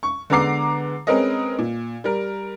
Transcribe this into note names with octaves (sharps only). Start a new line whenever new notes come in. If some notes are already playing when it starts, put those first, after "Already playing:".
C#6
D3 G#3 B3 A#5 D6 C7
G#3 C4 C#4 A#4 B4 D#5
A#2
G3 A#4